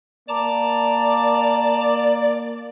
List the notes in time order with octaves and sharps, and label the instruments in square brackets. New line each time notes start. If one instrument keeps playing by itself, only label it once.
[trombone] A#3 [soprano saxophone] D5 [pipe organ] A5 A#5 D6